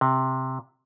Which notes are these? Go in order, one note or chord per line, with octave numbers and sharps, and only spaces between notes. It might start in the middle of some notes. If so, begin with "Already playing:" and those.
C3